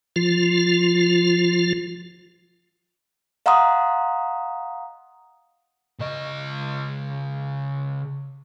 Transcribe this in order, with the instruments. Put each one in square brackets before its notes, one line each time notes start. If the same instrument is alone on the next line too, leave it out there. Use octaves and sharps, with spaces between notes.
[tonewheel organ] F3 F4
[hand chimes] D#5 F5 F#5 A#5 C6 D#6
[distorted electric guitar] C#3 D#5